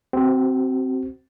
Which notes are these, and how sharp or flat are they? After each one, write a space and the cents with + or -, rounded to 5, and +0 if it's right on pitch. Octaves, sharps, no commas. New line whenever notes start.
C4 +0 F#4 +35